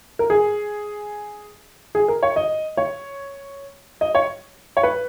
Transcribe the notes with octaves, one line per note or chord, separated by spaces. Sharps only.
A#4
G#4
G#4
A#4
C#5
D#5
C#5
D#5
C#5
C#5
B4